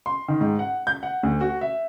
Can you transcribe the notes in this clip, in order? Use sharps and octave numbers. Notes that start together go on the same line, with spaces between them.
C6
D#3
G#2
F#5
G6
F#5
D2
F#4
E5